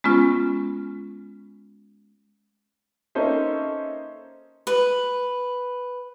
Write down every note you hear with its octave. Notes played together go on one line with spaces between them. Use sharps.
G#3 B3 C#4 F4
A#3 C#4 D#4 A4 C5 E5
B4